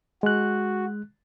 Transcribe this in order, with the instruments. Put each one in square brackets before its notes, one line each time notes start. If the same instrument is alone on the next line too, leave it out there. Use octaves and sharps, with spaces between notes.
[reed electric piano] G#3 F#6 [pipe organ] F#4